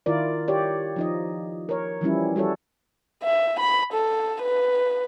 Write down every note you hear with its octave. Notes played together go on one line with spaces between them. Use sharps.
D#3 E4 F4 A#4 D5
G4 C#5 D5
F3 D#4 D#5
A#4 C#5
E3 F3 G3 C#4 E4
G3 F#4 A4 C#5
E5
B5
A4
B4